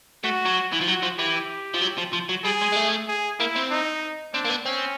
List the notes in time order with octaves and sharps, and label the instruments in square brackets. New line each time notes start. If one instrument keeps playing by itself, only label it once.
[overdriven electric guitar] A3 [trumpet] F#4
[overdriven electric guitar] F#3
E3
F3
[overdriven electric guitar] F#3 [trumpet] F#4
[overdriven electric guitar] F3
[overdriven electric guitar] E3 [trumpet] G4
[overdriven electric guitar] F3
F#3
F3
F3
F#3
[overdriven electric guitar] G3 [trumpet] G#4
[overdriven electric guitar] G#3
G#3
A3
[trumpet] G#4
[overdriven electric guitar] A#3 [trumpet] E4
[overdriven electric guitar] C4
[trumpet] D#4
[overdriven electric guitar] C4 [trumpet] D4
[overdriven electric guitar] A#3
B3
[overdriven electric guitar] C4 [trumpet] C#4